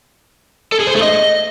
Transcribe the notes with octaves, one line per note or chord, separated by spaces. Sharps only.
A4
G#4
C5
A3
D#5